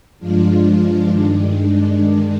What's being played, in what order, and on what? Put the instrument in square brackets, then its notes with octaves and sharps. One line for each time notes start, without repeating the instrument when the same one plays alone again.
[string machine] G2 F3 G#3 D4 F4
G2 D#3 G#3 D4